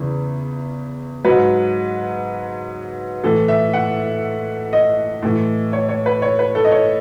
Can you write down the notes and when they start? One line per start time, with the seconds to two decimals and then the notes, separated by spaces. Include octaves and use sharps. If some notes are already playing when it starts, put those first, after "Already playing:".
Already playing: E2 C#3 E3
1.24 G#2 F#3 B4
3.24 A2 E3 A4
3.48 E5
3.73 F#5
4.73 D#5
5.22 A2 E3
5.73 C#5
5.89 C#5
6.06 B4
6.22 C#5
6.39 B4
6.55 A4
6.65 D#5
6.72 C#5